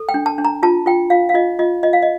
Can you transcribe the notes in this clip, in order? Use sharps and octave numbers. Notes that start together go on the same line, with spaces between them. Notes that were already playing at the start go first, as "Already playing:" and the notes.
Already playing: A4
G5
D4
A5
D4
A#5
F4 A5
F4 G5
F4 F5
F5
F4 D#5
F4 D#5
F4 D#5
F5
D#5